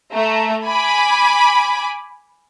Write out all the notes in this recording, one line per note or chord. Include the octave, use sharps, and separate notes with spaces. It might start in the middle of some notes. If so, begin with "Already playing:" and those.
A3 A#5
G#5 B5 D6